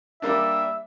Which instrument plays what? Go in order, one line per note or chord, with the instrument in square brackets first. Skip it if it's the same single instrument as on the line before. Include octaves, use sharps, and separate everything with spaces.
[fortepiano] G3 A#3 D4 [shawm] E5